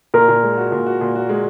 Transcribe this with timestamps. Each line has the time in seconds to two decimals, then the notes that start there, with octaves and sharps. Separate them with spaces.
0.14 A#2 A#4
0.28 A#2
0.43 G#3
0.58 F#4
0.72 A#2
0.86 F#4
1.01 A#2
1.15 F#4
1.29 G#3